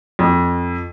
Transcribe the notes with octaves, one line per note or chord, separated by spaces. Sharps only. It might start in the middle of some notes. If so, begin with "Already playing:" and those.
F2